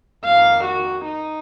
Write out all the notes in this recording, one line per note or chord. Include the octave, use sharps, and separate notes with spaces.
F2 D#3 A#3 F5
F#4
D#4